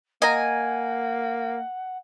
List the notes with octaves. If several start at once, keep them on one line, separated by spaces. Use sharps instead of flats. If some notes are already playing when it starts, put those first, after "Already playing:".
A#3 D#5 F#5 G#5 A#5